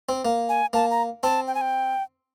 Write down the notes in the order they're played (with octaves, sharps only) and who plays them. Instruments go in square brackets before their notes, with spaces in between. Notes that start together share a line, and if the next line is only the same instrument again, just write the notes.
[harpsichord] C4
A#3
[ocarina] G#5
[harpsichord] A#3 [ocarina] A5
[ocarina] A#5
[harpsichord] C4 [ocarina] A5
[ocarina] G5
G#5
G5